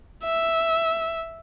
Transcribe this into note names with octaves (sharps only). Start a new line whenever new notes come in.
E5